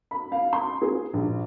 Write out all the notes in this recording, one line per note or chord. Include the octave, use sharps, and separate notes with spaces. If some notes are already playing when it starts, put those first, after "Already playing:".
B5
F5
C6
G#4
A#1